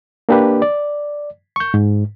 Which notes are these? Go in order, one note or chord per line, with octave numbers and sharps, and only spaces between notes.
A#3 D4 G4 B4
D5
C#6 G6
G#2